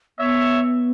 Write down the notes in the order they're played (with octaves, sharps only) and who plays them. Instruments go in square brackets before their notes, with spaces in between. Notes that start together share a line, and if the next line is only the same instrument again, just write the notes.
[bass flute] B3 [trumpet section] C#5 E5